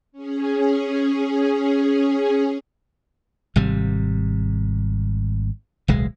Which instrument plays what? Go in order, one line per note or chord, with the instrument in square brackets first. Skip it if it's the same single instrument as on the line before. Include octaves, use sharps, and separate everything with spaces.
[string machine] C#4 G#4
[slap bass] G#1 C3 G3
D1 B1 G#3